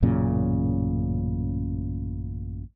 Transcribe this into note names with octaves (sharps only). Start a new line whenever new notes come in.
A1 F#2 A#2 C#3